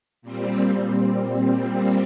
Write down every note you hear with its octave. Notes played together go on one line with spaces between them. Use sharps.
A#2 G3 C4